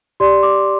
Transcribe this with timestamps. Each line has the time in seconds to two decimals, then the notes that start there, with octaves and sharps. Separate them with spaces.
0.20 G4 D5 C6
0.43 D6